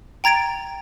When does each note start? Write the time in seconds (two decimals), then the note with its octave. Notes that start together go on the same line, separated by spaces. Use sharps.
0.24 G5 A#5 G#6 A6 D7